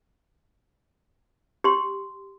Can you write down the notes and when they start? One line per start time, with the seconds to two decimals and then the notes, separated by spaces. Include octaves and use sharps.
1.64 G4 C6